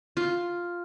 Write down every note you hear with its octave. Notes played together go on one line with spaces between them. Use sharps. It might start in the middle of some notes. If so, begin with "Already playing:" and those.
F4